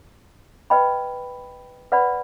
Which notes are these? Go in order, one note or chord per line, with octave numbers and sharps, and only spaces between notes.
B4 D#5 G5 B5
B4 D5 F#5 B5